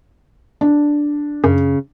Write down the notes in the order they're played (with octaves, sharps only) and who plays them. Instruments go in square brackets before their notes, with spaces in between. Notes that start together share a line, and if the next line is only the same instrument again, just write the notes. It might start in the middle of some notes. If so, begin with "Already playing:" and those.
[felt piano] D4
[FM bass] F#2 [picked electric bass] C#3